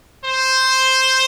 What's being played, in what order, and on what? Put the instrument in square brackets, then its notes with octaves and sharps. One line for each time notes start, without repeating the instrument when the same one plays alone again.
[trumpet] C5